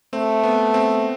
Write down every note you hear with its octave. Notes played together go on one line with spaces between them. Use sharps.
A3 C4
B3
C4